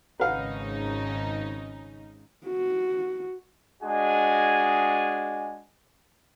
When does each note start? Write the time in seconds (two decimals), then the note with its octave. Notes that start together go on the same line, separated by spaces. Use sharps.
0.20 G#1 C#3 D#4 B4 F5 F#5
2.47 F#4
3.83 G#3 D4 F#4 G#4 D#5 G#5